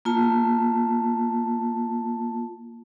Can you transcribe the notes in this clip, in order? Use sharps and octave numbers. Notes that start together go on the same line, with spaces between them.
A#3 F4 A5